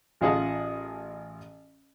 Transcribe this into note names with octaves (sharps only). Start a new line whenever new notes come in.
A1 F4 G#4 D#5 F#5 A5